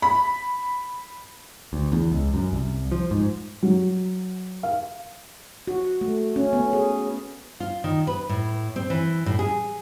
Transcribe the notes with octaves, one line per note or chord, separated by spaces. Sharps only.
B5
D2
E2
C#2
F#2
C2
F3
G#2
F#3
F5
F#4
A3
C#4
B3
G#4
F4
D#3
B4
A2
C4
E3
A2
G#4